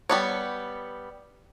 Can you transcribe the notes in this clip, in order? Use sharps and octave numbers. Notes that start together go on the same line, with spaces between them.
G3 B3 C#5